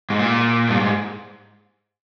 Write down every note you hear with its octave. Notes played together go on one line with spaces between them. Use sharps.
G#2
A#2
G2
G#2